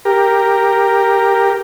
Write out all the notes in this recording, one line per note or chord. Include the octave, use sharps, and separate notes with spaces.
G4 A#4